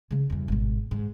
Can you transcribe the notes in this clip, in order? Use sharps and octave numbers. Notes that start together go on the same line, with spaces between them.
C#3 F3
E2 G2
G#1 B2
G#2